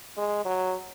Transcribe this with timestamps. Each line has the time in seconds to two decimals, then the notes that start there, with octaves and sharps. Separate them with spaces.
0.18 G#3
0.45 F#3